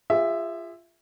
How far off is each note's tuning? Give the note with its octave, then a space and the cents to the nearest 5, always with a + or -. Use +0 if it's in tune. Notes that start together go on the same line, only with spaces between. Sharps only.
F4 -15 G#4 -35 E5 +0